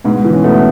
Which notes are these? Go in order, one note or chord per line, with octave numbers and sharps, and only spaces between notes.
G#2 B2 B3
E3
C#4
B2 A3 B3